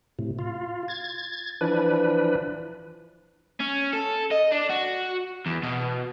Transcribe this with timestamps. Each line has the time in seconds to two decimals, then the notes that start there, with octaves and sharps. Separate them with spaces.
0.19 A2 C3
0.39 F4
0.88 G#6 A6
1.61 E3 F3 D4 B4
3.60 C#4
3.93 A4
4.31 D#5
4.52 D4
4.70 F#4
5.46 E2
5.63 B2